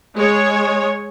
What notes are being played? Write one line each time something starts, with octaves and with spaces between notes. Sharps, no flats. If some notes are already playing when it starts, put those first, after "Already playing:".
G#3 C#5